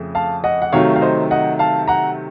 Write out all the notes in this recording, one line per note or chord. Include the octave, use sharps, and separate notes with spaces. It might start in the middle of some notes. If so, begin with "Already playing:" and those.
Already playing: F2 C#3 A3
F5 A5
D#5 F#5
F#5
C3 D#3 F#3 A3 C#5 F5
F5
C5 D#5
D#5 F#5
F5 A5
F#5 A#5